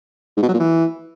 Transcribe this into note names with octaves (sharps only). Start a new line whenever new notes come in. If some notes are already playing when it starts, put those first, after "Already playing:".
G#2
B2
F#3
A#2
E3